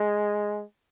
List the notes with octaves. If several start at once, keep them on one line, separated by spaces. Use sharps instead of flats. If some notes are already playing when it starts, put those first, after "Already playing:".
Already playing: G#3